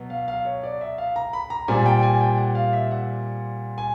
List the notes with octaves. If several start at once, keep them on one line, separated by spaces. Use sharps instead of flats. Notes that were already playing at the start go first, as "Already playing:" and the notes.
Already playing: B2 F#3 B3
F5
F5
C#5
D5
E5
F5
A#5
B5
A#5
A#2 G3 C4 G#5
G5
G#5
G5
F#5
F5
E5
F#5
G#5